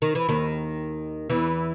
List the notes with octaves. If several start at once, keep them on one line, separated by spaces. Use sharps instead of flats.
D#3
E3
D#2 D#3
E2 E3